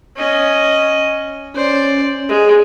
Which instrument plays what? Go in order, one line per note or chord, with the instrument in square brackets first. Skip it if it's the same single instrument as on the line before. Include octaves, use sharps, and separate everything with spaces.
[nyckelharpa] C#4 D#5
[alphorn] C#4 [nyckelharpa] C5 D5
[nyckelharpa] G#3 [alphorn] G#4